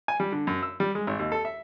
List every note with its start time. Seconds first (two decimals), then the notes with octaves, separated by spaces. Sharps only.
0.08 G#5
0.20 G3
0.32 D3
0.47 F#2
0.63 E6
0.80 G3
0.95 G#3
1.07 G#1
1.19 D#2
1.32 A4
1.45 E5